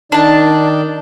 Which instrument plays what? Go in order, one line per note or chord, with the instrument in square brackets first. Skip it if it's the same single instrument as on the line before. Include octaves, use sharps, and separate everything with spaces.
[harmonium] D#3 D#4 D5 [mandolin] D4 A5